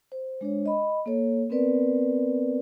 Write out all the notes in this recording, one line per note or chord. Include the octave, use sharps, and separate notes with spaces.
C5
G#3 D4 C5 C#5
D#5 B5
A#3 A4 C#5
B3 C4 A#4 B4 D5